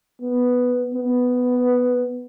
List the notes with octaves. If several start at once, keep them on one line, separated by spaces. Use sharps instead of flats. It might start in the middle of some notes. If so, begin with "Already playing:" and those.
B3
B3